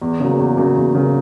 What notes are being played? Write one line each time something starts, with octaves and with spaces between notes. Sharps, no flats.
E2
C#3 F#3 A#3
E2
C#3 F#3 A#3
E2
C#3 F#3 A#3